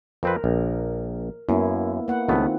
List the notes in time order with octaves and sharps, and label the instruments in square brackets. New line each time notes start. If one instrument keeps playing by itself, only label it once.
[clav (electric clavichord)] F2 C4 B4 [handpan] A#4
[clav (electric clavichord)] A#1
[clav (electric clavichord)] F#2 [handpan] A#3 B3 E4
[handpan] A#3 B4 F#5
[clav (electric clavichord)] C#2 A3 B3 [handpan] D#3 C4 F4